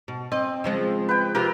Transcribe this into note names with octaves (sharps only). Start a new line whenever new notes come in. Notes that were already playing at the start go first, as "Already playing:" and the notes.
B2
C4 D#5
C#3 F3 G#3
B4 G5
C3 F4 G4 A#4 E6